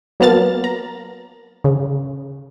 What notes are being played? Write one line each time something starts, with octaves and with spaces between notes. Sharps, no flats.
F#3 A#3 B3 A5 F6 A6
A#5
C#3